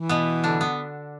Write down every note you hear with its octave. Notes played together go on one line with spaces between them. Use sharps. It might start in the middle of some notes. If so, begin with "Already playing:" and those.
Already playing: E3
B2 B3
D3 D4
B3